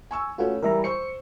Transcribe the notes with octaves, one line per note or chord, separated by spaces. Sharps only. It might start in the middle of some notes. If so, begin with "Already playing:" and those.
G#5 C#6 E6
A3 C#4 F4 F#4 B4
E3 G3 A#4 E5 A#5
C5 C#6 C#7